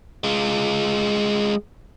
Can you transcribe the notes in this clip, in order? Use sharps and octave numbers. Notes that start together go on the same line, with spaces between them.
G#3 F4